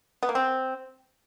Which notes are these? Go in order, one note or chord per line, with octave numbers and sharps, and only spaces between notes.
B3
A#3
C4